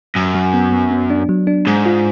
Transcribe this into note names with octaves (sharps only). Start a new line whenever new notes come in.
F#2 F#3
F#3
B3
B3
B3
D4
F#3
D4
G#2 G#3
F4